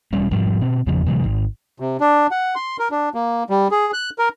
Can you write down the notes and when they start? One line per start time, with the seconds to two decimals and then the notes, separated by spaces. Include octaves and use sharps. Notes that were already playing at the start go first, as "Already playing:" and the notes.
0.13 E1 G3 C#4
0.31 G#2 F3 G3
0.61 B2 C4
0.87 E2 C#3 F3
1.06 C3 E3 F#3 G#3
1.24 G#1
1.80 C3
2.00 D4
2.31 F#5
2.55 C6
2.79 A#4
2.91 D4
3.14 A#3
3.50 G3
3.71 G#4
3.93 F#6
4.19 A#4